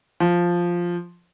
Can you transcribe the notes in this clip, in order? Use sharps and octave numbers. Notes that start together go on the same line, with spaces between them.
F3